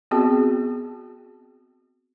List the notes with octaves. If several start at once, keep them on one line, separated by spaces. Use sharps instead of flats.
B3 C4 F#4 G#4